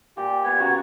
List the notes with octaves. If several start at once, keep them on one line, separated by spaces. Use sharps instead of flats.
A#2 G4
B3 G#6
C#3 F#4 A#5 C#6